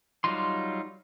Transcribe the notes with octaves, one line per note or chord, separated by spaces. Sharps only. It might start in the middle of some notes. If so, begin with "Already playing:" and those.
F#3 G3 D#4 F4 C6